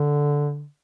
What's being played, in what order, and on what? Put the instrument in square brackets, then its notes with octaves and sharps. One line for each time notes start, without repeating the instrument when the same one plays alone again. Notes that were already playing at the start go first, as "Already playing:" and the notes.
Already playing: [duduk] D3